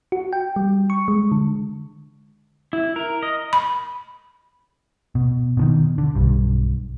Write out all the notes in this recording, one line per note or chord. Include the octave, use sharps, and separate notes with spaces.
F#4
G5
G3
C#6
G#3
D3
E4
A#4
D#5
B5
B2
B2 D3 D#3
D3
B1 G2